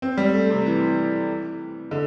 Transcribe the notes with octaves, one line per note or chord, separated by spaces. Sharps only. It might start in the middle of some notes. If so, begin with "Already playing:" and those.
C4
G3
A3
C3
E3
D3